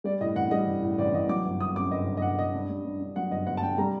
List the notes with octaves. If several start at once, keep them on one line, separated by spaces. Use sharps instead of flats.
G3 D5
A2 D#5
A1 F#5
G3 D#5
A1
A2
A1 D5
A1 D#5
F#3 D6
G1
G1 D#6
F#2 D6
G1 D#5
G1
D#5
G1 F#5
G1 D#5
G2
G2
G2
G2
F#3 F#5
G1 D#5
G1 F#5
A5
G2 G5
G3 A#5